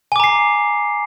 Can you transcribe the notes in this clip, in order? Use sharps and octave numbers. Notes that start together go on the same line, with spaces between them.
G#5 A#5 D6 C7